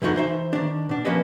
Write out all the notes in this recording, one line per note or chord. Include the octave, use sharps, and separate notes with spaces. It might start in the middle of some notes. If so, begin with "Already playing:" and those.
C2 F2 A#2 D3 D#4 F#4
E3 D#4 C5 E5
D#3 D4
B2 D4
F3 A#3 C#4 B4 D#5 E5